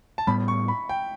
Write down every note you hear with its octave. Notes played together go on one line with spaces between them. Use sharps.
A5
A2 G3 B3 B5
C#6
B5
G5